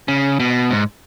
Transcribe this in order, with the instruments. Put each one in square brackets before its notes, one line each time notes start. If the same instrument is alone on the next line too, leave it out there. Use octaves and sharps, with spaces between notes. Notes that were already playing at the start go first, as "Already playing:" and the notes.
[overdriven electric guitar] C#3
B2
G#2